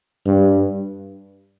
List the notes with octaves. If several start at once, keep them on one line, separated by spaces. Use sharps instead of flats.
G2